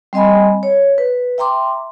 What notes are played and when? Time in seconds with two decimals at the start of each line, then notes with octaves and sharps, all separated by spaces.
0.13 G3 C4 D#5 G#5 B5
0.63 C#5
0.98 B4
1.38 E5 G5 A#5 C6 D6